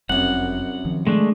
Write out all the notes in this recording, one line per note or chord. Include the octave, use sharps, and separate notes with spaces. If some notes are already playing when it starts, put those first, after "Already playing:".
F1 C2 F#2 G3 F#5
D#3 F3
G#3 A3 D4